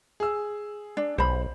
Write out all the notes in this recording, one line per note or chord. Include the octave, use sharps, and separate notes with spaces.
G#4 E6
D4
B1 C5 B5